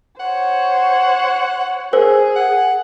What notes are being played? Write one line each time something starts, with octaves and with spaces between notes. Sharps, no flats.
C5 C#5 F#5
G#4 A#4 C5 E6
F#5